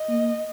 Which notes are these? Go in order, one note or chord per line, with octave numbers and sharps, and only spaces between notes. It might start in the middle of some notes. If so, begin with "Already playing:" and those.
Already playing: D#5
A#3